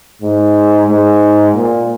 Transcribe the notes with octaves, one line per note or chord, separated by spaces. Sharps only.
G#2
G#2
A#2